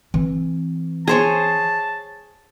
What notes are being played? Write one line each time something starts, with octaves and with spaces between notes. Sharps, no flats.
E3 C4
G#4 C5 C#5 A5